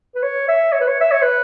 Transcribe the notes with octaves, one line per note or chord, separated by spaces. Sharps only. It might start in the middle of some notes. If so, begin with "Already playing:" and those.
B4
C#5
E5
C#5
B4
C#5
E5
C#5
B4